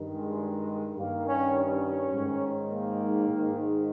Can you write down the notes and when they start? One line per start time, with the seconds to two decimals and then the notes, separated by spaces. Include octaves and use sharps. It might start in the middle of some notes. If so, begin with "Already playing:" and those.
Already playing: G2 D#3
0.12 G#3
0.97 G2 D#3 A#3
1.26 C#4
1.55 C#4
2.12 G#2 D#3
2.69 A#3
3.26 G#2 D#3